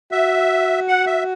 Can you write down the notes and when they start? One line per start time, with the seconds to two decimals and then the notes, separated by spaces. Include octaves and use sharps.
0.11 F#4 E5
0.88 F#5
1.06 E5